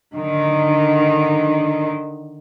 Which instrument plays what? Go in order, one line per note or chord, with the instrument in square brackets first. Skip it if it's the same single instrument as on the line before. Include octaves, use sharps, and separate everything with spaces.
[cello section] D3 D#3